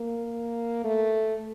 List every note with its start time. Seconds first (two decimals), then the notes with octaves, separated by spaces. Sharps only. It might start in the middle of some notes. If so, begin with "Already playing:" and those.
Already playing: A#3
0.84 A3